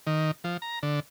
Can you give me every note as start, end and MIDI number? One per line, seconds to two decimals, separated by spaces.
0.07 0.31 51
0.44 0.57 53
0.62 0.79 82
0.83 1.00 50